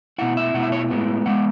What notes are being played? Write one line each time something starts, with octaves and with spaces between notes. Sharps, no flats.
B2 A3 E4 F#5
E5
B2 A3 E4 F#5
E5
C#5
A2 G#3 B3
A2 G#3 B3 F#5